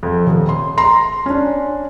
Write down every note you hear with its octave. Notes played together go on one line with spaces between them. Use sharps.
F2
D#1
C6
A#5 C6
C#4 D4